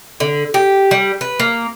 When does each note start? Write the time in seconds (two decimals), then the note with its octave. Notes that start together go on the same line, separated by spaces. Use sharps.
0.20 D3
0.54 G4
0.91 G3
1.21 B4
1.39 A#3